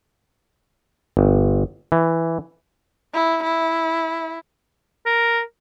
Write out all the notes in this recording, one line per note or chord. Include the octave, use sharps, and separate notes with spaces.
G1
E3
E4
E4
A#4